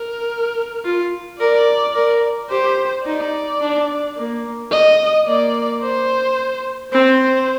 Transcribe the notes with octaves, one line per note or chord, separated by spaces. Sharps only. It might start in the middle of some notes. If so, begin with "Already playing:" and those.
Already playing: A#4
F4
A#4 D5
A#4
G4 C5
D#4 D5
D4
A#3
D#5
A#3 D5
C5
C4 C5